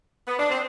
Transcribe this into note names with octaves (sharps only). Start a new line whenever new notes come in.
B3
D4
C4